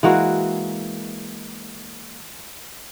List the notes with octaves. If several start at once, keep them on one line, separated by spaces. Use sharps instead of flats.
E3 G#3 A#3 F#4